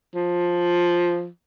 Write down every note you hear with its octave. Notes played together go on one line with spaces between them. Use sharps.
F3